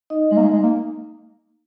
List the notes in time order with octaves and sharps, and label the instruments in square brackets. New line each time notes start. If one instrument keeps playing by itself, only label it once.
[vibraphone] D#4 D#5
[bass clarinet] G#3 [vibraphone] D#4
[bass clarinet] A#3
G#3
G#3
A#3